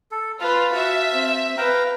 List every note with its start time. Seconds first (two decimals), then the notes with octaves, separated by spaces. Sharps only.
0.11 A4
0.40 F4 B4 F5 A5 B5
0.73 F#4 E5
1.11 C4
1.57 B4 F5 G5 A#5